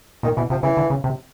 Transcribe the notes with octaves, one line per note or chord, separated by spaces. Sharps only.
A#2 D#3
B2 E3
C3 F3
C#3 E3
D3
C#3
C3